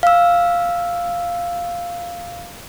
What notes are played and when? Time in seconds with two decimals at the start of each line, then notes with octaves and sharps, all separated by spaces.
0.03 F5 E6